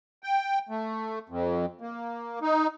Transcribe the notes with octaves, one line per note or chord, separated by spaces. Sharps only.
G5
A3
F2
A#3
D#4